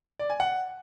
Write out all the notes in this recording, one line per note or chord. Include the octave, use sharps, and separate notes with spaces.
D5
G#5
F#5